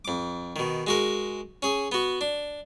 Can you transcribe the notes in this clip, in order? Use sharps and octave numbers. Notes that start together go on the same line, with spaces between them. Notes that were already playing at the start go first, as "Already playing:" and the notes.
F2 D6
B2 D#3
G#3 F#4 A#4
C#4 G#4
B3 F#4
D4